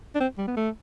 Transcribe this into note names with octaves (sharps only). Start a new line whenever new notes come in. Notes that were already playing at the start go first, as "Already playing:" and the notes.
D4
C4
G3
B3
A3